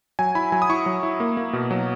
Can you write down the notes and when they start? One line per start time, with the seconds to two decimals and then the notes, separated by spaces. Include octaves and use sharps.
0.19 F#3 G#5
0.35 E4 B5
0.52 F#3 G#5
0.62 D#6
0.70 E4 C#6
0.86 F#3
1.03 E4
1.20 A#3
1.37 A#3
1.53 B2
1.71 F#3